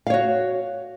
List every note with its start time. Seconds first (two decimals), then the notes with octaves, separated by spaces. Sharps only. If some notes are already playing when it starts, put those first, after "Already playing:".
0.07 F5
0.10 C#5
0.14 F#4